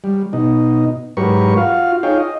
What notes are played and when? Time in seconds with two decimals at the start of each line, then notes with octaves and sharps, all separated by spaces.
0.04 G3
0.33 B2 D#4
1.17 G#2 F#3 G4 A#4 B4 C#6
1.57 F4 F#4 F5
2.03 D#4 F4 G#4 C#5 F5 G5
2.19 D#5